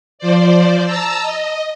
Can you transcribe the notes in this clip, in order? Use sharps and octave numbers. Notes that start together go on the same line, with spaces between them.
F3 C5 D5
A5 A#5 E6
D#5